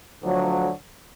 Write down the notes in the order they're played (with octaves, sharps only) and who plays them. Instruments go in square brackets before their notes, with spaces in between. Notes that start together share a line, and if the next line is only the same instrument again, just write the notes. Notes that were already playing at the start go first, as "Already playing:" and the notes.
[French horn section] D2 D3 F3 F#3